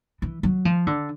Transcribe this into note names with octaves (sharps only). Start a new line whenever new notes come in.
E3
F#3
F3
D3